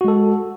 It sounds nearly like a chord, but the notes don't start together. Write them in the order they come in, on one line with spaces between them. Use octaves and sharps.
F#4 G#3 A4